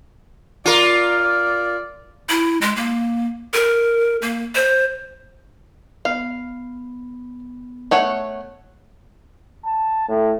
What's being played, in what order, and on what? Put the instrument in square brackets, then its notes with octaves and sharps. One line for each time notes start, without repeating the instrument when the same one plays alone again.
[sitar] F4 A#4 [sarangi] D5
[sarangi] D5
[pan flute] E4
G#3
A#3
A#4
A#3
C5
[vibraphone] B3 [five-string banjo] F5
[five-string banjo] A3 C#5 F#5
[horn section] A5
A2